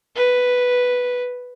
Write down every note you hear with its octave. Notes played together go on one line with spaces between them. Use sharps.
B4